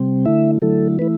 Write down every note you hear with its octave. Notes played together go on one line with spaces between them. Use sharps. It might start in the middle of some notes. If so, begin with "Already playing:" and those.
Already playing: C3 G3 C4
D3 A3 E4 E5
D3 F#3 A3 E4 A4
E3 A3 E4 B4